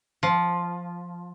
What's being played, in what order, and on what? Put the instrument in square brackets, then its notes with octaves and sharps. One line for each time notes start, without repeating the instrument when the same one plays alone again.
[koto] F3